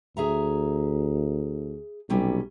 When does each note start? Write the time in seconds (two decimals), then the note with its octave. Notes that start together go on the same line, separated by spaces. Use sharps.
0.17 D2 G#4 E5 A#5
2.10 B1 C3 G3 C#4